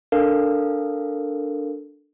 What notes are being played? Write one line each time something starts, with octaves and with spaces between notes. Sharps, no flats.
D4 A4 A#4 F5